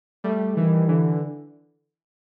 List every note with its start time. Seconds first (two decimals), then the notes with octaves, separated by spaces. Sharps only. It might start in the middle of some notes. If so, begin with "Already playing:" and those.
0.24 G3 A3
0.57 D#3 E3
0.89 D3 E3